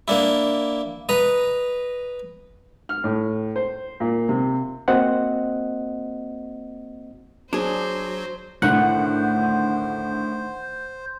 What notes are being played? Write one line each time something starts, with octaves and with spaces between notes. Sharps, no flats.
A#3 D4 E4
B4 D#5 A#5
F6
A2
C5
A#2
C3
A#3 C4 F#4 C5 D#5 F#5
F#3 D4 G#4 C5
A2 D3 D#3 A3 C5 F#5